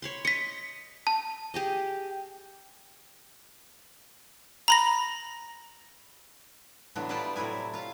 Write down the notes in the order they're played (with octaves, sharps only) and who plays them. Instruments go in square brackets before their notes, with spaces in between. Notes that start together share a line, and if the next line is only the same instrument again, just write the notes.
[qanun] C#5 B5 C6
[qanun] D#5 [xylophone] B6 C#7
[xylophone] A5
[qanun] G4 G#4 D#5
[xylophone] A#5 B5 A#6
[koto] A2 D3 E3 F#3 B3
G3 E4 F4 B4 D5 A5
A2 C3 F#3 E4 G#5
F4 F5